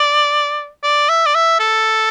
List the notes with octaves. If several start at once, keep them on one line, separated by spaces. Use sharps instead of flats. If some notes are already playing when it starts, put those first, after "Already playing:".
Already playing: D5
D5
E5
D5
E5
A4